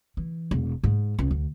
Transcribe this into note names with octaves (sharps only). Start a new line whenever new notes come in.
E3
E1
G#2
C#2
D2